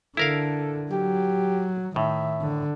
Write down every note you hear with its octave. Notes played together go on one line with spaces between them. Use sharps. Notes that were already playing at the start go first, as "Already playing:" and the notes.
D3 E4 A4 A#4 F5
F#3 G4
A2 D#3 E5
D3